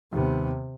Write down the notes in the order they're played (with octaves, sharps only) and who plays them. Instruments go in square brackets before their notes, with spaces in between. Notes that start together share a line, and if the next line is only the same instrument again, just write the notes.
[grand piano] D#2 D#3 G3 B3 [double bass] C3